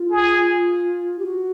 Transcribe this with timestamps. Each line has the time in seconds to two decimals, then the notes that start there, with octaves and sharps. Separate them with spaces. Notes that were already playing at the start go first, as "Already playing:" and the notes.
Already playing: F4
0.11 G#4
1.19 G4
1.25 F#4